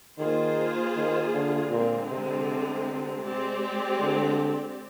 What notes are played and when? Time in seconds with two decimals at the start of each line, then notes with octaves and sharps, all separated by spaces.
0.18 D#3 A#3 F4 G#4 C5
0.96 D#3
1.34 D3
1.71 A#2 D3 G#3 C4
2.10 C3
2.48 C3
3.24 G#3 C4 G4 D5
4.01 D3